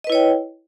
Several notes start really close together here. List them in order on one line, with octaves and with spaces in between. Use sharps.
D#5 B4 E4 C#5 G5